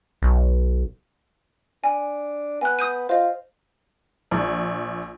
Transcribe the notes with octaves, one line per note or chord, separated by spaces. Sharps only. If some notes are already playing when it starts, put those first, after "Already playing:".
B1
D4 G#5
B3 G#5 F#6
D#6 G6 D#7
F4 C5 D#5
A#1